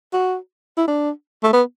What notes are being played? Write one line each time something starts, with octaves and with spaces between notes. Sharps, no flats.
F#4
E4
D4
A3
B3